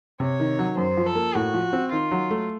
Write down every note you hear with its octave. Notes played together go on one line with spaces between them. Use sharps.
C3 C#5
D#3
F#3
F#2 C5
F3
A4
A#3
A2 F#4
F3
C4
D#3 F4
F#3
A3